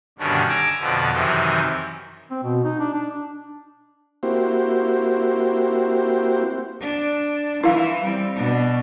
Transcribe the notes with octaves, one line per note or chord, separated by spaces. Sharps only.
G2 B2 D3 D#3 C#4 D4
G#5 A#5 D6 E6
F2 B2 D3 F3
F#2 C3 D#3 E3
C4
B2
D#4
D4
D4
A#3 C4 E4 F#4 G4 C5
D4
E3 E4 F5
G3 C4
B2 D4